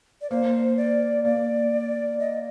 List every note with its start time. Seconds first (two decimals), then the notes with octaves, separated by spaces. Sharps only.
0.21 D5
0.30 A#3 C5
0.77 D5
1.25 A#3 D5
2.19 D#5